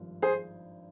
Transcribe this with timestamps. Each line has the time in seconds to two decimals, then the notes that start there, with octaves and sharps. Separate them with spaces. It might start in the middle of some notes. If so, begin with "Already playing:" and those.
Already playing: G#1 G2 F3
0.22 G#4 C5